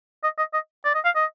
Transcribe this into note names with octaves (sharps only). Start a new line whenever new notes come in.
D#5
D#5
D#5
D5
D#5
F5
D#5